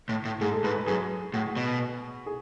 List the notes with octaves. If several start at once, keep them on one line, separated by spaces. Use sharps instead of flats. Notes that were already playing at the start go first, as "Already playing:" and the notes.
A2
A2
G#2 G#4
A4
G#2 B4
B4
F#2 G#4
A2 F#4
B2
G#4